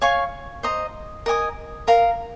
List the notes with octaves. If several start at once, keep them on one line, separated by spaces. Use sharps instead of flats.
C#5 F5 G#5 C#6
C5 D#5 A#5
A#4 D#5 G#5 D#6
A#4 F5 A#5